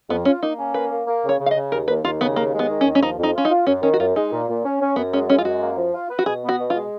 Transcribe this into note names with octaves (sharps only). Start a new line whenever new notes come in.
F2 B3
C#4 F4
A#3 D#4
C#4
A#3 B4
A#3
A#3
C#3
C#5
C#3
F5
D#5
C#3
D#2 A#4
D#2 B4
D#2 F4
C#3 B3
D#2 A#3
G#3
B3
D#3
C#4
D#2
C#4
F3 D#4
F2
D#4
C#4 F4
D#4
F4
F#2 C#4
D#3 C#4
F#4
F#2 F4
G#3 D#4
A#2
A#2
C#4
C#4
F#2 B3
G#3 C#4
G#3 C#4
F4
F#2 F#4
A#3
F3
F4
B4
F#4
B2 G#4
B3
F#4
B2
F4
G#3